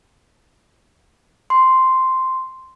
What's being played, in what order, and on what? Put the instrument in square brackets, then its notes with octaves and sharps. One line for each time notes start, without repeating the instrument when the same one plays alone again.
[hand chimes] C6